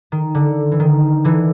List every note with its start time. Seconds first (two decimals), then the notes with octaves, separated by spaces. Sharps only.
0.12 D#3
0.35 D3
0.72 E3
0.80 D#3
1.24 D3 E3